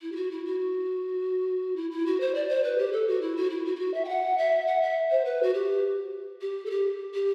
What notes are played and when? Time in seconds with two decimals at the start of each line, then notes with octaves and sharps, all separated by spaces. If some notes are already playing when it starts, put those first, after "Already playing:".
0.02 E4
0.12 G4
0.16 F#4
0.31 E4
0.45 F#4
1.76 E4
1.91 E4
2.06 F#4
2.20 C5
2.35 D5
2.49 C5
2.63 B4
2.78 G4
2.92 A4
3.07 F#4
3.21 E4
3.36 F#4
3.50 E4
3.65 F#4
3.76 E4
3.79 F#4
3.94 E5
4.04 G5
4.09 F#5
4.38 E5
4.67 F#5
4.82 E5
5.11 C5
5.25 B4
5.43 F#4
5.54 G4
6.41 G4
6.65 A4
6.70 G4
7.14 G4